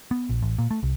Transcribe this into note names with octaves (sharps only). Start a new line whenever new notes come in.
B3
A#1
A1
A#2
A3
C2